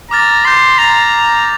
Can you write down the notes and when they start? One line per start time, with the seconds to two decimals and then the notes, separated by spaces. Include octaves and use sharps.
0.11 A#5 D6 F6 A6
0.44 C6 D6 G6 A#6
0.78 A#5 A6 C7 F7